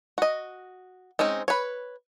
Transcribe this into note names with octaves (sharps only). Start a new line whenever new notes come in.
F#4 D#5
G#3 C4 C#4 D#4
B4 C#5